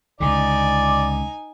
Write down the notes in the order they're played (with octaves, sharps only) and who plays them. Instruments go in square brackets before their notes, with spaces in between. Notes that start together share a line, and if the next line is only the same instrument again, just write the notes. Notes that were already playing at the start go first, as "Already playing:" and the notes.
[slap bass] C#2 D3 [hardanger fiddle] D#4 G#5 [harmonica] D5